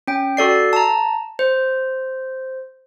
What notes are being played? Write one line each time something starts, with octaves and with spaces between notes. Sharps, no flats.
C#4 G5
F#4 A4 D5 C7
A5 A#5
C5